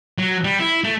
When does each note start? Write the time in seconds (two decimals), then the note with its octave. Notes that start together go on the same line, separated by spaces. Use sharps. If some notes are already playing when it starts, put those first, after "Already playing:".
0.18 F#3
0.44 G3
0.60 E4
0.84 A3